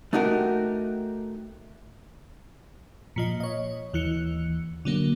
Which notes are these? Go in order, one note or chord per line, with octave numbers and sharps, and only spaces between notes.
A3 D#4 F#4 G4 A#4
A#2 F3 D#5
C#5 D#5
D#2 E3 F#6 C#7
D3 F#3 A#3